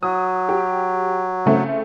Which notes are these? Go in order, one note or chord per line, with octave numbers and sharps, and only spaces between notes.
F#3 D#6
G4
C#3 A3 C4